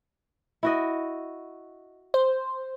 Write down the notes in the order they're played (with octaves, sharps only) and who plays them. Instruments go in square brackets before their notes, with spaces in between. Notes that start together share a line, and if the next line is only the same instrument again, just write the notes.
[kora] E4 F#4 D#5
[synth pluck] C5